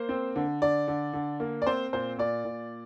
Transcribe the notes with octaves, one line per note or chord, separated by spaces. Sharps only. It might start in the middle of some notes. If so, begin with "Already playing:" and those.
Already playing: A#3 C5
C4
D3
D3 D5
D3
D3
A#3
D5
C4 C5
A#2 C5
A#2 D5
A#2